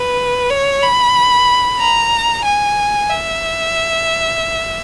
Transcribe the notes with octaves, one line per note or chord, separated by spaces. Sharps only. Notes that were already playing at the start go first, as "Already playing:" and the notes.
Already playing: B4
C#5
B5
A#5
G#5
E5